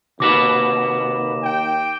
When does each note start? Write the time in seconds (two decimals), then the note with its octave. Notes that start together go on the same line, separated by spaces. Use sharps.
0.20 D#2 C3 F#4 B4 D6 A#6 E7
1.43 G5